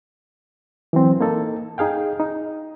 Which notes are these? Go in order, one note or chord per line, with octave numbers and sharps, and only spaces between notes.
E3 F#3 C4
A#3 D#4 A4
D#4 G#4 F5 G5
D#4